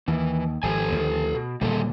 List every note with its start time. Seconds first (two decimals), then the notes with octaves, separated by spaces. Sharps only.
0.08 D#2 E3
0.63 G#1 F3 G4 A4 G#5
0.92 D2 D#3 F3
1.34 B2
1.61 D#1 A#2 D3 G3 G#3 A4